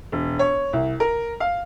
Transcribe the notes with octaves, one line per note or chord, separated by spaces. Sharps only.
E1
C#5
C2
A#4
F5